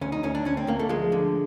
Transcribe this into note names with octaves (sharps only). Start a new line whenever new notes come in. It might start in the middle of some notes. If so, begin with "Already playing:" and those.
D2 C#4
D#4
D2 C#4
D4
D2 C#4
C4
D2 A#3
A3
F3 G#3
D3